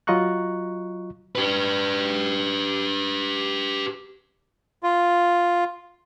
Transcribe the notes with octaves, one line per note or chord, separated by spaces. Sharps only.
F#3 F4 D#5 A#5 C#6 F#6
G4 B4
F4